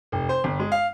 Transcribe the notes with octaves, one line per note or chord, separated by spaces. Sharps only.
F1
C5
G1
G#3
F5